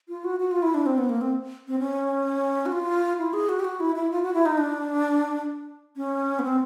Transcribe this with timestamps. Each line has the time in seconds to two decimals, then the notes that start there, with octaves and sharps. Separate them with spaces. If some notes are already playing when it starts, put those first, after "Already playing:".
0.09 F4
0.24 F#4
0.40 F#4
0.51 F4
0.62 E4
0.74 D4
0.86 C4
0.98 B3
1.09 A#3
1.21 C4
1.68 C4
1.79 C#4
2.66 F#4
2.72 F4
3.18 E4
3.33 G#4
3.49 F#4
3.60 G4
3.65 F#4
3.80 E4
3.95 E4
4.11 F4
4.23 F#4
4.34 E4
4.46 D#4
4.57 D4
5.96 C#4
6.39 B3
6.43 C4